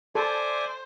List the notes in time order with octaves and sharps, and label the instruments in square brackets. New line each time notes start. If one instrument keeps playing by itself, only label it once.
[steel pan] A4 [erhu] C5 [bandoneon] D5 E5 G#5